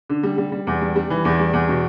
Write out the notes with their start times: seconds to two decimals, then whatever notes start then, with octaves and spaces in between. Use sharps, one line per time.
0.10 D3
0.23 G3
0.38 G3
0.52 G3
0.67 E2
0.81 G3
0.96 G3
1.10 E3
1.25 E2
1.39 G3
1.53 E2
1.68 B2